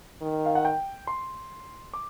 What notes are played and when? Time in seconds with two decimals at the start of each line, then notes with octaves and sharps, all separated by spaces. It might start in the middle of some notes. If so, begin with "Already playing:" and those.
0.22 D#3
0.46 F5
0.55 F#5
0.65 G5
1.07 C6
1.94 D6